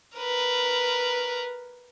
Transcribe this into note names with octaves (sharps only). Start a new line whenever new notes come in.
A#4 B4